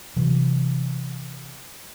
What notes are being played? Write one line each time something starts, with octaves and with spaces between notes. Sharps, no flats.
C3 E3 F#3